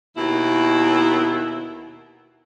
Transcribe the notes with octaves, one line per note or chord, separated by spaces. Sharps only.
D#2 B2 E4